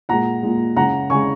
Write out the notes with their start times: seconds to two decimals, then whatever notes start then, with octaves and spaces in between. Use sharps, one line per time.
0.09 A#2 G#3 F#5 A#5
0.43 A#2 G#3
0.76 C#3 G#3 F#5 A#5
1.10 C#3 G#3 G#5 C#6